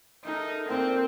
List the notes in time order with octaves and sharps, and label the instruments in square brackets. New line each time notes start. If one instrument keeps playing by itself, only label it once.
[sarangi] D#4 [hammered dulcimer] A4 A#4 E5
[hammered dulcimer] A#2 D6 [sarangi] C4